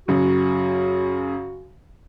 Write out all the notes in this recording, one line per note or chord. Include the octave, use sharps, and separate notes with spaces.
F#2 C#3 F#4